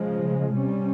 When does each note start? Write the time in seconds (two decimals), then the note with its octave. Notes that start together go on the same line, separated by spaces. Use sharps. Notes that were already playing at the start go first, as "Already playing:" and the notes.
Already playing: C#3 F3 G#3
0.53 C3 G3 C#4